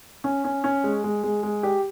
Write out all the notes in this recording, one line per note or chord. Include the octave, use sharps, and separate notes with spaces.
C#4
C#4
C#4
G#3
G#3
G#3
G#3
G4